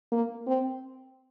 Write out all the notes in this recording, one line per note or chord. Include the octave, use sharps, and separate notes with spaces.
A#3
C4